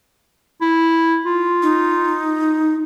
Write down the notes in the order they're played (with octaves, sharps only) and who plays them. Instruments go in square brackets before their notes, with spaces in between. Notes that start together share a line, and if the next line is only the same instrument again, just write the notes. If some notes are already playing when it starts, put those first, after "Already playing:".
[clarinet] E4
F4
[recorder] D#4